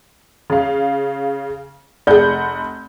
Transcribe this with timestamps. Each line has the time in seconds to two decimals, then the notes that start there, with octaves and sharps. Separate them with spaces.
0.50 C#3 F5
2.07 F1 G#4 D5 F#5 G6